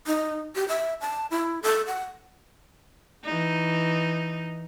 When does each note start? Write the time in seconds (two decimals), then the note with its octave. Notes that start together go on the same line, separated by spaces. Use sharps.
0.07 D#4
0.55 G4
0.68 E5
1.01 A5
1.31 E4
1.63 A4
1.87 F#5
3.25 E3 D#4